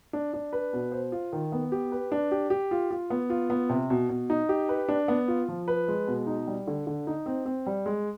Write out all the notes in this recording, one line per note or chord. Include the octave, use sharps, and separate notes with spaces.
D4
D4
B4
B2
C5
F4
D#3
B3
G4
B4
D4
G4
G4
F4
F4
B3
F4
B3
C3
B2
B2
D#4
G4
B4
D4
B3
F4
F3
B4
G#3
B2
D#4
G3
D3
D3
D#4
C4
C4
G3
G#3